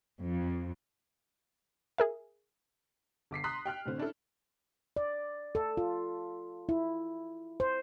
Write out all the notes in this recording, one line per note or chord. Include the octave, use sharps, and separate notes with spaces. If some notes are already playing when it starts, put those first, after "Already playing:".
F2
G#4 A#4 E5
G1 D6 B6 C7
A#5 C6 D#6 F#6 B6
G5 F6 F#6
A2 D3 C4
C#4 D4 E4 A4
D5
A4
F4
E4
C5